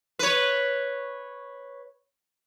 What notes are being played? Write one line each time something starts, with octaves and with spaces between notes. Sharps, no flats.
B4 C#5